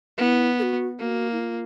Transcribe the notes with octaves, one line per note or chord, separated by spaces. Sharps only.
B3 E4
A4
F#4
A#3 F#4
E4
F4